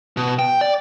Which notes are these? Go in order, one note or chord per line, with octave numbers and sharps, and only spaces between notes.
B2
G5
D5